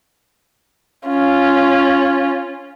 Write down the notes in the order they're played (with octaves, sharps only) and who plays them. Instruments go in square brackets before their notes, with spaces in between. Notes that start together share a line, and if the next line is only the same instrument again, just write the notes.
[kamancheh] C#4 F4